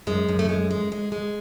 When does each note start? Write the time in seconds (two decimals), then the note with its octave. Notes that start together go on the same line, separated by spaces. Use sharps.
0.07 F#2 G#3
0.29 F#2
0.39 A3
0.49 G#3
0.71 G#3
0.92 G#3
1.12 G#3